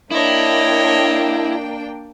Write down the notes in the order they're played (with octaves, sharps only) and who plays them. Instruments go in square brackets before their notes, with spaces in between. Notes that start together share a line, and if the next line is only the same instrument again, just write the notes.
[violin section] A#3 D4 G5 [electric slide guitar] E4 [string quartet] C#5 D#5